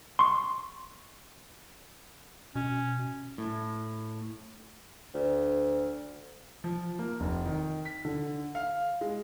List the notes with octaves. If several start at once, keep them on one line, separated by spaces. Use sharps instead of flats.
C6 C#6
B2 C#4
A2
D2
F3
A#3
F1
D#3
B6
D3
F5
G#3